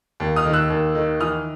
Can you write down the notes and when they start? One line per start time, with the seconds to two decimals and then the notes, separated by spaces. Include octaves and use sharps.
0.20 D#2
0.36 D#6 F6
0.45 D#3
0.53 E6 F#6
0.70 D#2
0.95 D#3
1.20 E3 D#6 F6